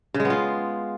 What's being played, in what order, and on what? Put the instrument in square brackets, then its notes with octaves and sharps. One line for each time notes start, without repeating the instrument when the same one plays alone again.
[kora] C#3
G#3
B3
F4